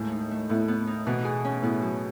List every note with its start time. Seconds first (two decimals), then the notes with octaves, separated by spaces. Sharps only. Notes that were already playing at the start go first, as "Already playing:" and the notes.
Already playing: D#2 A2 G#3 A3
0.12 D#4
0.31 A3
0.49 A2 B3
0.68 B3
0.87 D#4
1.06 B2 E3
1.25 G#4
1.44 C#4
1.62 A2 B3
1.82 F#3